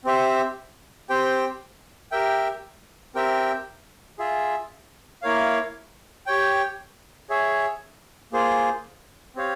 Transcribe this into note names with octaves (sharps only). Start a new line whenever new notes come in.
C4 G4 C5 E5
C4 G4 C5 G5
G4 A#4 E5 G5
C4 G4 A#4 E5 G5
F4 G#4 E5
A#3 E4 A#4 C#5 F5
G4 C#5 G5
G#4 C#5 E5
A#3 F4 G#4 C5
C4 G4 C#5 F5